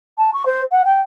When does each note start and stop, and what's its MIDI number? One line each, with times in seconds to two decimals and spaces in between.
0.18 0.30 81
0.34 0.46 85
0.46 0.61 72
0.71 0.82 78
0.85 1.01 79